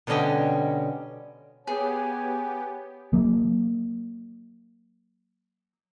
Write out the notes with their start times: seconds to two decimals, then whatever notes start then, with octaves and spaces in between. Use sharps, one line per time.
0.07 B2 D3 G3 C#4 D#5 G5
1.67 B3 G4 G#4 C#5 G#5
3.13 F#3 A#3